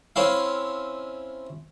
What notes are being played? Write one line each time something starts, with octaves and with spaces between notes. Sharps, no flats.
C4 C#4 E4 F5